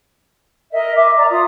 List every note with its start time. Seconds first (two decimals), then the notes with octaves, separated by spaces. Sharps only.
0.71 A#4 D#5 E5
0.95 E5 D6
1.16 D5 A#5
1.29 F4 D#6